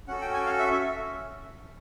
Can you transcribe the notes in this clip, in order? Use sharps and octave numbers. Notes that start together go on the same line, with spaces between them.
C#4 F#4 A4 F#5
G5
G#5
F5
E5
E5